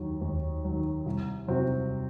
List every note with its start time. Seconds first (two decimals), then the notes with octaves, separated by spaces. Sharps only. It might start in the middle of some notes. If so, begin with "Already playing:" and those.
Already playing: D#2 D#3 F#3
0.21 D#2
0.64 D#3 F#3
1.06 C2
1.48 C3 F#3 C4 F#4